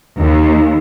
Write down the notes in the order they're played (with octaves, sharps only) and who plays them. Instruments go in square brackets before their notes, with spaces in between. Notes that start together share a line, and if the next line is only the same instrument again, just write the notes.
[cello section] D#2